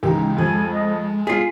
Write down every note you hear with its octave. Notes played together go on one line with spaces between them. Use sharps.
C#2 E3 G#3 D#4 G4
F2 F3 G#5
D#5
B3 F4 G#4 B6 C7